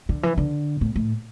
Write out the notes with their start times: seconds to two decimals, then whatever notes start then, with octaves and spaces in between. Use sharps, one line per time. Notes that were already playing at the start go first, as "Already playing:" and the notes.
0.09 D3
0.23 E3
0.38 D3
0.81 A2
0.96 A2